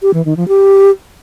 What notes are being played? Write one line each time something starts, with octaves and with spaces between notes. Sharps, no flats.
G4
E3
D#3
F3
G4